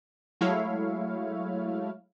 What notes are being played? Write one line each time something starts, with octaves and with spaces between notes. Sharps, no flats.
F#3 G#3 A3 E4 C#5 F5